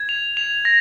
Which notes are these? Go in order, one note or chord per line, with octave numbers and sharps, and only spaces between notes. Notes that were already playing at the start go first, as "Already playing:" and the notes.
Already playing: G#6
F7
F7
A#6